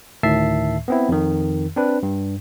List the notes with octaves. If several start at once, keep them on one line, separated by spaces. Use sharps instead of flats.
D2 A2 D#3 E5 A5 C7
B3 C4 E4
F2 D#3
C4 D4 B4
G2